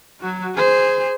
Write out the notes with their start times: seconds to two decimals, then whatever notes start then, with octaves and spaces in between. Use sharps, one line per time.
0.20 F#3 F#4
0.55 G#4 C5